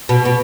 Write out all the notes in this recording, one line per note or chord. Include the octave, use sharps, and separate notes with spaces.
B2
B2